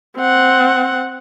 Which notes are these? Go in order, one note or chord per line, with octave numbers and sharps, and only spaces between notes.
C4 F#5